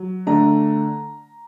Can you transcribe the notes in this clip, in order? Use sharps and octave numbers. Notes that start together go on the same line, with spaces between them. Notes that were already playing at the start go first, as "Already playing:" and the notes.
Already playing: F#3
D3 A3 D4 A#5